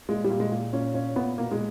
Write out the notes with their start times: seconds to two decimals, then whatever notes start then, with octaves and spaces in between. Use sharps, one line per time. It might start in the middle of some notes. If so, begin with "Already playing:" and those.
0.09 A#2 G#3
0.24 G3
0.30 A#2
0.40 G#3
0.52 A#2
0.73 A#2 C#4
0.94 A#2 C#4
1.16 A#2 B3
1.38 B2 A#3
1.51 G#3